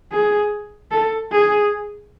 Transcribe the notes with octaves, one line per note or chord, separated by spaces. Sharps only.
G#4
A4
G#4